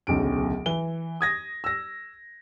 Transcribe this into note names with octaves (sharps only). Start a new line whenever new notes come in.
D1 B1 C#3 D7
E3 G7
D#6 G#6 A#6
E6 A#6